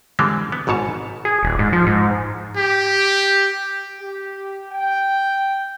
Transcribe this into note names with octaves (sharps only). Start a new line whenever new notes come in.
D3 E3 G3 G#3 C4
B3
G#1 G#2 B2 C#5 A5
G#4
D#1
G#2
F3
G#2
G4
G4
G5